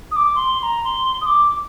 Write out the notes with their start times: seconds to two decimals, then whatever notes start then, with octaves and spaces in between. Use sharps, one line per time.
0.11 D#6
0.16 D6
0.35 C6
0.60 C6
0.63 A#5
0.84 C6
1.21 D#6
1.26 D6